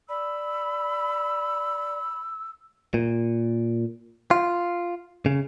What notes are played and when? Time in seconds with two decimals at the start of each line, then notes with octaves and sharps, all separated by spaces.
0.09 D5 B5 E6
2.94 A#2
4.31 F4
5.26 C#3